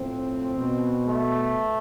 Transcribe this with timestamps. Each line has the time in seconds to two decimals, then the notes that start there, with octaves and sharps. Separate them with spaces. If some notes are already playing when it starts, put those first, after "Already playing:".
Already playing: A2 F3 C4
0.56 B2
1.06 A3